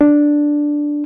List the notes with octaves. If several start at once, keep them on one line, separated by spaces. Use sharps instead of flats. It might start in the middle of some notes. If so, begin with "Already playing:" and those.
D4